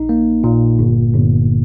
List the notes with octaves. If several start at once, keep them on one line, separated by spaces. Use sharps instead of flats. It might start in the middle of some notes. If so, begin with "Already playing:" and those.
Already playing: A#1 D#4
A#3
A#2
G1
G1